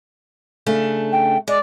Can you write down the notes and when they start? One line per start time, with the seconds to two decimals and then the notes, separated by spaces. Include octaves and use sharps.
0.66 C#3 A3 D4
1.12 G5
1.48 G#3 D5